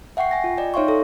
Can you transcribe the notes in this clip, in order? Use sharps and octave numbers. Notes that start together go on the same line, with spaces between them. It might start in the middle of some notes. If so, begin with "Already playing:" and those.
E5 F#5 G5 C#6 C7
G#5 A#6
F4
D5 D#5 G5
D#4 C#5 E5 F5 C6 C#6
A4